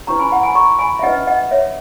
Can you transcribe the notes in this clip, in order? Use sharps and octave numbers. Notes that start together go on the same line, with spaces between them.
C#4 E4 B4 A#5 C#6
G#5 B5
F#5 A#5
G#5 B5
A#5 C#6
G#5 B5
E5
C#4 E4 B4 D#5 F#5
D#5 F#5
C#5 E5